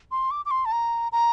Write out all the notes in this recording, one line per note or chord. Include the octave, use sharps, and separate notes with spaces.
C6
D6
D6
C6
A5
A#5
A#5